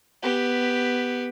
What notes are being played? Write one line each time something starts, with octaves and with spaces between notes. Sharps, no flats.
B3 G4